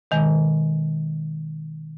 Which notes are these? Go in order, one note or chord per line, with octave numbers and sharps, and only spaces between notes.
B2 D#3 G#3